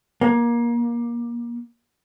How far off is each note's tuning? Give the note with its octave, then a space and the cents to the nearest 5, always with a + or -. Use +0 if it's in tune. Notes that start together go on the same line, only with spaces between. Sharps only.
A#3 +25